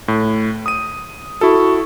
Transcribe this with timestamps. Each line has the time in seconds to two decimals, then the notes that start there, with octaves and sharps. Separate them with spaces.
0.08 A2
0.66 D#6 D#7
1.41 E4 F#4 A4